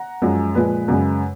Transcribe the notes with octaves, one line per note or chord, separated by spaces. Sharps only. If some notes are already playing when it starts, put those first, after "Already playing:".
Already playing: F#5 A#5
F#2 F3 G#3
A#2 F3 G#3 B4
F#2 C#3 G#3